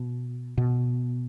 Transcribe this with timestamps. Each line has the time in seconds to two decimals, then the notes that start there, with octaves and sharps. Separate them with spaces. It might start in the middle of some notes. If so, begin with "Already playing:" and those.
Already playing: B2
0.58 B2